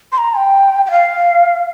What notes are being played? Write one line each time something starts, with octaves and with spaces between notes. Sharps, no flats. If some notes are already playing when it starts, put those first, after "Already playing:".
C6
A#5
G5
G5
F5